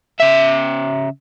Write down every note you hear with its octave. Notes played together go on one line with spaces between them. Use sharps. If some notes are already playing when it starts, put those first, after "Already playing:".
C#3 E5